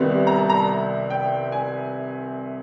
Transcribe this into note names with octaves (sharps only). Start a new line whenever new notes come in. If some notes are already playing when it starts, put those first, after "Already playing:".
Already playing: C2 C3 D#3 G3 B3
A#5
A5
A#5
G5
G#5